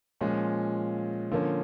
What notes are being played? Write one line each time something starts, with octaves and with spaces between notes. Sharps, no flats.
A#2 F3 G#3 C#4
D3 F3 A#3 C#4